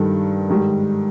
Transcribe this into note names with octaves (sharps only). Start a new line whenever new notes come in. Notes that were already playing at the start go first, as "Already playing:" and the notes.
Already playing: G2 D#3 G3 A4
G#2 D#3 G3